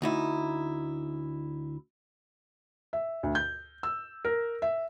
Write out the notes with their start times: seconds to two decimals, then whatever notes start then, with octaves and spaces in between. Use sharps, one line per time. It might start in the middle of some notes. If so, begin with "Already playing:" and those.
0.02 D2 D#4 E4
2.93 E5
3.23 D2
3.35 G6
3.83 E6
4.25 A#4
4.62 E5